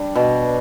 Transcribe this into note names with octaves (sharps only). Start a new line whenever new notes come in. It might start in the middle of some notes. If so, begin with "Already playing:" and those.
Already playing: G3 D4 G5
B2